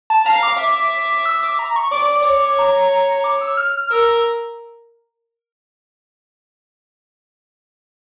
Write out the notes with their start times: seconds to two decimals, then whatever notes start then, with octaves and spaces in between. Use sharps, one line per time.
0.10 A5
0.26 F5 A#5
0.43 D6
0.59 E5
1.26 E6
1.43 D6
1.59 A#5
1.76 C#6
1.92 D5 D6
2.25 C#5
2.59 A#5
3.24 D6
3.41 E6
3.57 F6
3.74 F6
3.91 A#4 E6